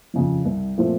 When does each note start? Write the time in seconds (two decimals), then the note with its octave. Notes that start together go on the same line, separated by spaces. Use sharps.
0.14 F2 C#3 F3
0.46 C2
0.78 A#2 F3 A3 C4